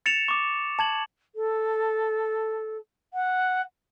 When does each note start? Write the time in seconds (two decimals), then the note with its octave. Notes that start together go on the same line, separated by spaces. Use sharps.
0.06 A6 C#7 E7 F7
0.28 C#6 D6
0.79 A5 G#6 F#7
1.35 A4
3.14 F#5